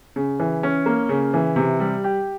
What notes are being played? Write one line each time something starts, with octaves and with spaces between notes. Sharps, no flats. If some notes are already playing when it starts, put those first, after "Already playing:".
C#3
E3
C#4
A#3
C#3
E3
C3
G3
G4